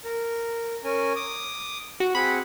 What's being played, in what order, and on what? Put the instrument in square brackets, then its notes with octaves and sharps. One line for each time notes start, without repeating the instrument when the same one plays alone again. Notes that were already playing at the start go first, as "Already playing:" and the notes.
[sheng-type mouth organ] A#4
C#4 A#4 G#5
D6 D#6
[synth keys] F#4
[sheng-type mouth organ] C4 G#4 F#5 [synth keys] B5